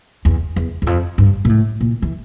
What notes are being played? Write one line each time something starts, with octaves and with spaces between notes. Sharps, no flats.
E2
E2
E2
F2
G2
A#2
A2
A#2
E3